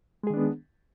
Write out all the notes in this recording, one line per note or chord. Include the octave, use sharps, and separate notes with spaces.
D#3 G#3 B3 D4 G#4